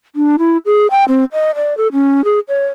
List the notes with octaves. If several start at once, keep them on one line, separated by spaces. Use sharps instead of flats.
D4
E4
G#4
G5
C4
D#5
D5
A4
C#4
G#4
C#5